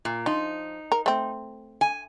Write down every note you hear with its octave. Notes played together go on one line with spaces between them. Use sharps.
A#2
F3 D#4
A#4
A3 C4
G#5